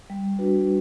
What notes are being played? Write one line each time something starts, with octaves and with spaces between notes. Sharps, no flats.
G3
D4 F#4 B4